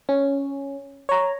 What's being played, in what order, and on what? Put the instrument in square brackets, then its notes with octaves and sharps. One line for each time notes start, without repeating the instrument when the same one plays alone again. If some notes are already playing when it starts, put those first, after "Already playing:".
[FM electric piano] C#4
C#5 A#5